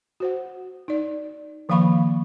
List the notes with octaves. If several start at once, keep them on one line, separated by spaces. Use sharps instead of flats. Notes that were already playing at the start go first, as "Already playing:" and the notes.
F#4 C5 F#5
D#4 D5
D#3 F3 A#3 F5 B5 C#6